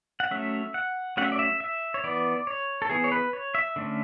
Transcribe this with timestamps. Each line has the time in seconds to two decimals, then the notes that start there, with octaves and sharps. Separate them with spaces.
0.20 F#5
0.31 F#3 A3 C#4 E5
0.74 F#5
1.17 F#3 A3 C#4 F#5
1.24 E5
1.32 D5
1.39 E5
1.60 E5
1.94 C#5
2.04 E3 B3 D5
2.47 C#5
2.82 A4
2.89 E3 B3 G#4
3.04 C#5
3.12 B4
3.33 C#5
3.55 E5
3.76 D3 A3 C#4